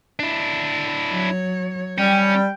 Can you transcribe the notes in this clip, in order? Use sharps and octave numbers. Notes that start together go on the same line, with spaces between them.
D4 E4
F#3 C#5
G3 C#4 G5